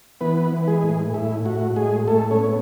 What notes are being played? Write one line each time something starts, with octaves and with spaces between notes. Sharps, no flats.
E3 B3 B4
E3
G#3 G#4
A2
A2 E4
A2 F#4
A2 G#3 G#4
A2 A3 A4
C#4 C#5
B3